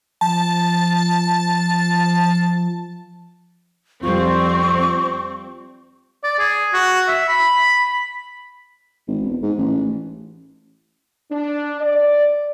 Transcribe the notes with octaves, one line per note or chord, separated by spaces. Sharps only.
F3 A5
F2 G3 C4 F4 C#6
D5
G#4
F#4
E5
B5
G#1
E1
G#2
A1
D4
D5